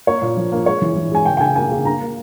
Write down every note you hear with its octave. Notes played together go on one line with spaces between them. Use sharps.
A#3 C#5
A#2
F3
A#3
G#3 C#5
E3
E3
G#3 G#5
C#3 G5
G5
C#3 G#5
A#3 G#5
C#3
A#3 A#5
A#3